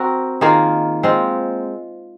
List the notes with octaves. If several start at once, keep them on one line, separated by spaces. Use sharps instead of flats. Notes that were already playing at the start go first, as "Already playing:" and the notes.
Already playing: C4 F#4 A#4
D#3 A#3 F4 G#4
G#3 C4 F4